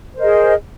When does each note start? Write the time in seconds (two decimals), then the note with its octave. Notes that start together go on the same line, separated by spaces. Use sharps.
0.14 C5
0.17 A#4
0.20 D#5
0.23 G#4